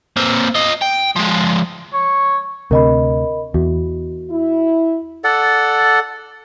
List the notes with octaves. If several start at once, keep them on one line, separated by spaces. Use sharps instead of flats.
A#3 C4
F4 D#5
G5
F3 G#3
C#5
D2 C3 A#4 D#5 B5
E2 F#4
E4
A4 D5 F#5